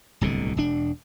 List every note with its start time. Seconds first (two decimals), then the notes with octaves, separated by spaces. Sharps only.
0.21 D1 C2 B2 D3
0.57 E1 D4